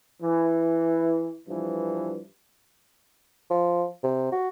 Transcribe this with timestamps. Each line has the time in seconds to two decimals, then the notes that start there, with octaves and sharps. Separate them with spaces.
0.22 E3
1.48 G2 E3 F3
3.50 F3
4.03 C3
4.32 F#4